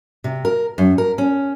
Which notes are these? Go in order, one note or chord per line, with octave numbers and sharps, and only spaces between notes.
C3
A#4
F#2
A#4
C#4